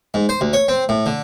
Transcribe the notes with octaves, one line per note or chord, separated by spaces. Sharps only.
G#2
C5
D2
C#5
C4
A2
D3